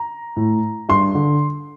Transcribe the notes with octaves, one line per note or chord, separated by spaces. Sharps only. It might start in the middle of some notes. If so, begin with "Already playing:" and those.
Already playing: A#5
A2
G2 C6
D3